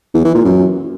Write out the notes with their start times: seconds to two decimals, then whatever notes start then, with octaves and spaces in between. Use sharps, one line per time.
0.14 E2
0.24 E3
0.35 A#2
0.45 F#2